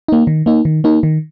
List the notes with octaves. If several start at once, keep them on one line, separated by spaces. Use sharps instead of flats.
A#3 D#4
D#3
A#3 D#4
D#3
A#3 D#4
D#3